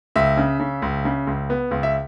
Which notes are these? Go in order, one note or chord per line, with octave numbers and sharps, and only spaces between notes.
C#2 E5
C#3
C#3
C#2
C#3
C#2
B3
C#2
E5